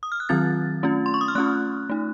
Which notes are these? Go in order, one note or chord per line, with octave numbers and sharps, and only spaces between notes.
D#6
F6
F#6
D#3 F#3 C4 F4 A6
A3 C#4 F4
C6
C#6
D#6
F6
A3 C#4 F4 F#6
A3 D#4